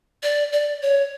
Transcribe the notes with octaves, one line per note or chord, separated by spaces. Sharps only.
D5
D5
C#5